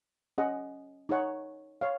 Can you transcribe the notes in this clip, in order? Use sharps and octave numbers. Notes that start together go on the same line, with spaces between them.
C#4 G#4 D#5 F#5
D#4 G#4 C#5 F#5
C#5 F5